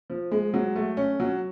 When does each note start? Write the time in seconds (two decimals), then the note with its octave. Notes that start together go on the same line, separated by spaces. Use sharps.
0.10 F3
0.31 G#3
0.54 F#3
0.76 A3
0.97 C#4
1.20 F#3